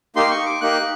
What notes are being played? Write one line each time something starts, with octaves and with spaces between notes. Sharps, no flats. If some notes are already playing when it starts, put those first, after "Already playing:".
A#3 D#4 G4 C6
C#6
D6
A#3 D#4 G4 F#6